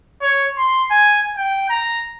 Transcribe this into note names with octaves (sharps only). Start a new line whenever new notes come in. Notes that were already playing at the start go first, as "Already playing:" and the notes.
C#5
C6
G#5
G5
A#5